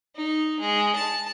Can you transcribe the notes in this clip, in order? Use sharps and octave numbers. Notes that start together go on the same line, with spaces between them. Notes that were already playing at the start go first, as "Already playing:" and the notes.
D#4
G#3
A5